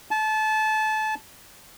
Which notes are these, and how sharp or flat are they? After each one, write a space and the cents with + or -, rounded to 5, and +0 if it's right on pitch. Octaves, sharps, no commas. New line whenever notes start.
A5 -25